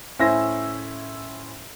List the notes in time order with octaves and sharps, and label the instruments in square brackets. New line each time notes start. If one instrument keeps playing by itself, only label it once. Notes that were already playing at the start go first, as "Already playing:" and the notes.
[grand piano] A2 C#4 E4 C5 E6 A#6